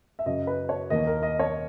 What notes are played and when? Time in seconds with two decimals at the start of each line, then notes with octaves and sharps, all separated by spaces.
0.19 E5
0.26 F#2 C#3 F#3 D#5
0.47 B4
0.69 C#5
0.90 D#2 D#3 A#3 D#5
1.07 A#4
1.23 D#5
1.39 C#5